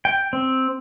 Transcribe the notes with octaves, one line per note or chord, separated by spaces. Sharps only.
G5
C4